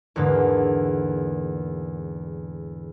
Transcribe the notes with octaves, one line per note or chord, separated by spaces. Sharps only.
E2 G#2 D3 A#3